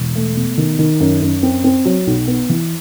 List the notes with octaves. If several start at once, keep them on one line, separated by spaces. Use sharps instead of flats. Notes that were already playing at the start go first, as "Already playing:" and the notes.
Already playing: E1
A3
B2
D#3
D#3
F#2
F#2
C4
C4
F#3
B1
B3
E3